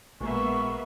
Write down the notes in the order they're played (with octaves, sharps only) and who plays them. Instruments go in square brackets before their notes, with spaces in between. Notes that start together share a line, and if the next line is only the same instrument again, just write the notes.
[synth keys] A#1 B2 G#3 [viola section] A#3 B3 E5 [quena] C#6